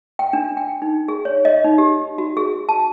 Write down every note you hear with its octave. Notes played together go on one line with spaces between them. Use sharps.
G5
D4
G5
D#4
G#4
C#5
D#5
D#4
G4
F#4
G#4
A5